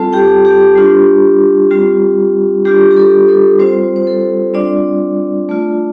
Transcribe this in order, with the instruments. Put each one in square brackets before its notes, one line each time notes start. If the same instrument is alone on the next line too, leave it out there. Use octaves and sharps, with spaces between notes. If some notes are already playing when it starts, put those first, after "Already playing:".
Already playing: [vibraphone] G3 C4 F4 A4 A5
G4 G5
G4
G3 D4 F4
G3 C4 F4
G3 D4 F4 G4
G4
A4
A4
G3 C4 F4 C5
C5
A4
G3 C4 D4 F4 D5
A3 F4